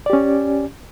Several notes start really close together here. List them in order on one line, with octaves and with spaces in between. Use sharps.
D5 G4 C#4